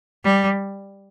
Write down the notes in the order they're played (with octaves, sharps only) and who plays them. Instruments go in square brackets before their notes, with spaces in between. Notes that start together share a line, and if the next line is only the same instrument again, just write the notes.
[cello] G3